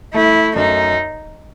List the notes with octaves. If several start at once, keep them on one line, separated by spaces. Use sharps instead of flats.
A3 E4
F#2 D#4